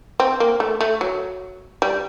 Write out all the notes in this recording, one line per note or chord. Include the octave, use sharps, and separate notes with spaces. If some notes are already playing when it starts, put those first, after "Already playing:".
C4
A#3
A3
A3
F#3
G3